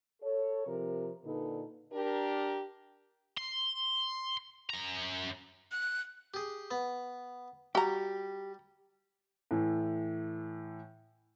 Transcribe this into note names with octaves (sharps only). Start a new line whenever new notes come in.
A4 C#5
C3 F3 A#4
A#2 D3 D#4 A4 B4
D4 G4 A#4
C6
F#2 A#5
F#6
G4 G#4
B3
G3 F#4 G4 A#5
A2 E3